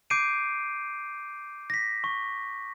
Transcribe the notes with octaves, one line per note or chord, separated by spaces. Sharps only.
D6 G6 C7 D7 D#7
A#6 B6
C#6